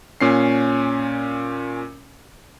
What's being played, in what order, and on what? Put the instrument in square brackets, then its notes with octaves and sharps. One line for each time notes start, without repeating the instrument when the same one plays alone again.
[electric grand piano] A#2 C#4 C7